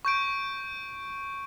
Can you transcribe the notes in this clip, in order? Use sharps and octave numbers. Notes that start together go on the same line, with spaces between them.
C#6 G6 D7